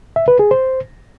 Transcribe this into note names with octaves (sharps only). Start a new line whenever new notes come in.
E5
B4
G#4
C5